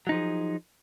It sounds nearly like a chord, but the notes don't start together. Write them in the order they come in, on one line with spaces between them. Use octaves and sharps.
F#3 D#4 F3 G#4